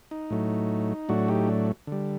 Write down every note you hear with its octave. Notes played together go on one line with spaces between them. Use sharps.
D#4
A2 F#3 A3
A2 F#3 A3 D4 F#4
D#4 G4
D4
D3 G3